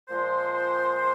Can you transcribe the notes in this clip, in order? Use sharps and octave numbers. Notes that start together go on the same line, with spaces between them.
A#2 F3 G#3 C5